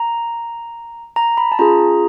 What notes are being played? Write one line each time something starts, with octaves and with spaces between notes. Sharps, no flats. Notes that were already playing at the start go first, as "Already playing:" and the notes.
Already playing: A#5
A#5
B5
A5
C#4 F4 G#4 A#5